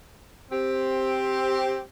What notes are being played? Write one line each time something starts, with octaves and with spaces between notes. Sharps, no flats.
C4 G4